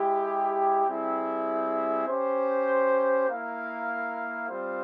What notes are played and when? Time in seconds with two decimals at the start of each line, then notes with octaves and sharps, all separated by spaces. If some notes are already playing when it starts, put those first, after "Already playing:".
Already playing: G#3 E4 G4
0.87 G3 C4 E4 G#4 E5
2.08 C#4 G4 C5
3.28 A#3 E4 A#4 F5
4.49 G3 C4 F4 C5 F5